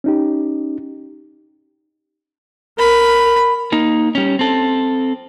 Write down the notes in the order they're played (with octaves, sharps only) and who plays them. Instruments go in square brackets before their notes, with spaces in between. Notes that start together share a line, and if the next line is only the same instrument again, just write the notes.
[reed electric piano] C#4 D#4 G4
[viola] A#4 [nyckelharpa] B5
[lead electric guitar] A#3 D#4
G3 C#4
C4 A4